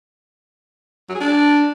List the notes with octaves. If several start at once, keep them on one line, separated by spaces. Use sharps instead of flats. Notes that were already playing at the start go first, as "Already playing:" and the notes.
F#3
G#4
D4